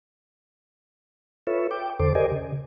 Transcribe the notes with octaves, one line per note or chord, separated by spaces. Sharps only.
F4 A4 B4 C#5 E5
G5 D6
E2 D3 A4 C5 D6
G4 A#4 C5 D5 D#5 G#5
C#3